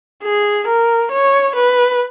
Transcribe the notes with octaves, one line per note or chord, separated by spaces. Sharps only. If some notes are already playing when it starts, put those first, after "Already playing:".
G#4
A#4
C#5
B4